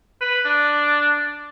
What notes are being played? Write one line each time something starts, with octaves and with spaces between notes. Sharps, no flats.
B4
D4